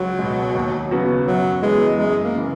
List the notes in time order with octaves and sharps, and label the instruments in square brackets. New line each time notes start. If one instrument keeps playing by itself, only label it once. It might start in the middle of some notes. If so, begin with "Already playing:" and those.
Already playing: [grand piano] C#2 [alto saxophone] F#3
[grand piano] B2 G#3
D#2
C#3 F#3 B3 F#4
[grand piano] F#2 [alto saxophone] F#3
[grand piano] E3 B3 [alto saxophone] G#3
[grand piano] F#2 [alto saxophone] G#3
[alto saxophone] A#3
[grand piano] C#3 E3